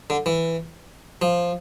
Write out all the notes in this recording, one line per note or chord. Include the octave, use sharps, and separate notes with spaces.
D3
E3
F3